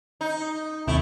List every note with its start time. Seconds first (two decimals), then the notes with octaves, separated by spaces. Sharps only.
0.21 D#4
0.87 D#2 C3 A3 E4